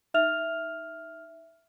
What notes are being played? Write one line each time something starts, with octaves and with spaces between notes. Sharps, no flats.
D#4 E5 F6 F7